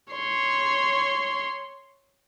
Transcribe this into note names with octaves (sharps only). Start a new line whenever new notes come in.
C#5 C6